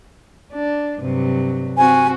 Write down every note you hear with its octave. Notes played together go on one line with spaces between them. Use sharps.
D4
G2 C3 F#3
C4 F#4 G#5